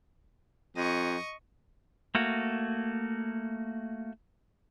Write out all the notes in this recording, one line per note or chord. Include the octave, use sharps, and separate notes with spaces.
F2 D#5 C#6
A3 A#3 F#4